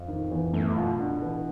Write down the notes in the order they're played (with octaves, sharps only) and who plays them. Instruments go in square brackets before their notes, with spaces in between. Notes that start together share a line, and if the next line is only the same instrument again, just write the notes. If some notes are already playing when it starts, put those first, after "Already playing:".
Already playing: [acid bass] F2
[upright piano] D#3
E2
[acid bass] F#2 [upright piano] A3
[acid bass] B2 [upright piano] F4
[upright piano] D4
E3